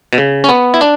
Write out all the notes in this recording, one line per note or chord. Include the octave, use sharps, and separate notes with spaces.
B2
C#3
C#4
B3
E4
D4